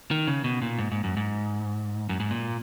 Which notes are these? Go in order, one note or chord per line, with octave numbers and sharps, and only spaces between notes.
D#3
C#3
B2
A#2
G#2
G#2
F#2
G#2
F#2
G#2
A#2